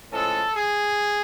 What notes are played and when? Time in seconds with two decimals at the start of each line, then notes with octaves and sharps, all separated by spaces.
0.12 A2 F3 G#3 C#4 A4
0.55 G#4